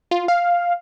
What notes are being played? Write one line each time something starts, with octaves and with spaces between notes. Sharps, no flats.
F4
F5